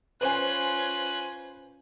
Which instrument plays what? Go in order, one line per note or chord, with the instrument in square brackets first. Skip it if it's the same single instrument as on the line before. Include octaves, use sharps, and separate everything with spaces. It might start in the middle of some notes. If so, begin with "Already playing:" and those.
[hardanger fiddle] C#4 F4 [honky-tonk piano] B4 C5 G#5 [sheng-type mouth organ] F#6